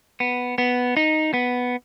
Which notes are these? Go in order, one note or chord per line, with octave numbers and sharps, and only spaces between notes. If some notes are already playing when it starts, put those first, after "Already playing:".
B3
B3
D#4
B3